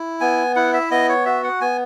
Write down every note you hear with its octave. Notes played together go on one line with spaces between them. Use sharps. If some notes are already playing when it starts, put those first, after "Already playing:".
Already playing: E4
B3 G#5
E4 F#5
E5
B3 D#5
C#5
F#4 E5
F#5
B3 G#5